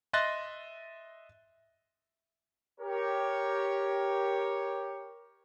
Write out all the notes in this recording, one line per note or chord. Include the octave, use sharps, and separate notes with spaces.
D#5 E5 C6 F#6 A6 A#6
G4 A#4 C#5